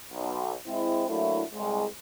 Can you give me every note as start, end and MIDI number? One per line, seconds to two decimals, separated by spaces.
0.12 0.52 35
0.67 1.04 56
0.67 1.04 60
0.67 1.04 64
1.08 1.41 54
1.08 1.41 57
1.08 1.41 58
1.08 1.41 62
1.08 1.41 64
1.53 1.85 36
1.53 1.85 56